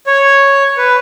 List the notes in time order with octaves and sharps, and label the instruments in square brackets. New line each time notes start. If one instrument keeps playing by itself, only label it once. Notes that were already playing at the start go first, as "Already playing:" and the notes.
[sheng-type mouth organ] C#5
B4